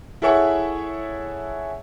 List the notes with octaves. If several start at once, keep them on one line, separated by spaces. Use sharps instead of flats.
E4 G#4 A4 C#5 E5 F#5